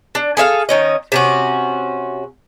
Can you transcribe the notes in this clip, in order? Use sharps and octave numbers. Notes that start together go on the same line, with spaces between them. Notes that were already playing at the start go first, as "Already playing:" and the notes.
D4
G#4 A4 E5 F5
D#3 C#4 D#5
C3 C#4 F#4